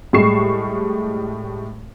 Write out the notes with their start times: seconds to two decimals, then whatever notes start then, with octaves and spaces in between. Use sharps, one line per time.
0.13 A2 G3 G#3 C#6 C7 E7